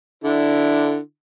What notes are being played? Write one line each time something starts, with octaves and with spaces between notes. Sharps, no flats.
D3 D4 E4